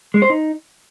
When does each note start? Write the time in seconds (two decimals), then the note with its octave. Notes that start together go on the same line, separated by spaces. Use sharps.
0.14 G#3
0.22 C5
0.30 D#4